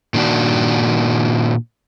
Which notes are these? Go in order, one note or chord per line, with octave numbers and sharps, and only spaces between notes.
A#2 D#3 D4 F#4